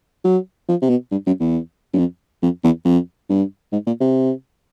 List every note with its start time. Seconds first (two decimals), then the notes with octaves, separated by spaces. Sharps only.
0.24 F#3
0.69 F3
0.82 C3
0.89 B2
1.11 G2
1.26 F#2
1.40 E2
1.93 F#2
1.98 F2
2.42 F2
2.64 E2
2.85 F2
3.29 G2
3.72 G#2
3.87 A#2
4.01 C3